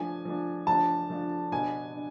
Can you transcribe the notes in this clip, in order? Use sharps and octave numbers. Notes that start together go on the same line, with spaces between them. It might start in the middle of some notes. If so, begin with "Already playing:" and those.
Already playing: F3 A3 D4 G#5
F3 A3 D4
F3 A3 D4 A5
F3 A3 D4
B2 B3 D4 G#5
D4